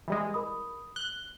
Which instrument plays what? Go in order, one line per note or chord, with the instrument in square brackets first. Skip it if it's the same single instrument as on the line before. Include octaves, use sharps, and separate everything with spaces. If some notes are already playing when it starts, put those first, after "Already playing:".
[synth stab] E3 G3 G#3
[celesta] A#4 B5 D#6
[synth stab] F#6 [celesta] G7